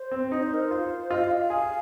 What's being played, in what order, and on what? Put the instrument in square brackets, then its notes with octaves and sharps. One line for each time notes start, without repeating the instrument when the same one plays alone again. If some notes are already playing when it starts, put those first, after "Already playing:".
Already playing: [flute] C5
[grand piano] C4
[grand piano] D#4 [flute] D#5
[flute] C5
A#4
C5
[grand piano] F4
[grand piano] F4 [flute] D#5
[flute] F5
D#5
F5
[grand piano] G#4